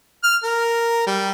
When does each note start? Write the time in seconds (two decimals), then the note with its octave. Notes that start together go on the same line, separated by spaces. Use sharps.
0.23 F6
0.43 A#4
1.06 G3